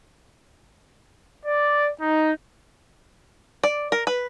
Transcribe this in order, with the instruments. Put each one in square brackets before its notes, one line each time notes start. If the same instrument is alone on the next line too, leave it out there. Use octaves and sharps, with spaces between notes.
[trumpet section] D5
D#4
[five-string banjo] D5
A#4
B4